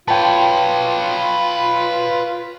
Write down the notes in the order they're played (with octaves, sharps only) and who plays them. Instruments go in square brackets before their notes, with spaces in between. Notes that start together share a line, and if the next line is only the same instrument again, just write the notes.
[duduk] F4 [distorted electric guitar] B4 C#5 [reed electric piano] G5 A5